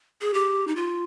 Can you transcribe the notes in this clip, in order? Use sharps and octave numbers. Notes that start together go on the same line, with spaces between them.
G#4
G4
D#4
F4